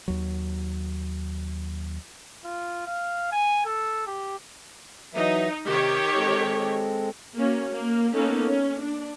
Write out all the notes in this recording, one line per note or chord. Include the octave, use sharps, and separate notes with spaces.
D#2 F#3
F4
F5
G#5
A4
G4
E3 F#3 D#4 E5
C3 D#3 G4 C#5
G#3 C4 A4
A#3 C#4 F#4
A#3
A#3 B3 C#4 D#4 A4
C#4
D4